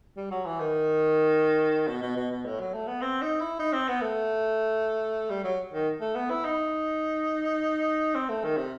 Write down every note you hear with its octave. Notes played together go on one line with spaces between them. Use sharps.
G3
F#3
E3
D#3
B2
B2
B2
B2
A2
F#3
A3
B3
C4
D#4
E4
D#4
C4
B3
A3
G3
F#3
D#3
A3
B3
E4
D#4
C4
A3
D#3
C3